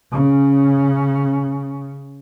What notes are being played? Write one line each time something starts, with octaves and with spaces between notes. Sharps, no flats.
C#3 C#4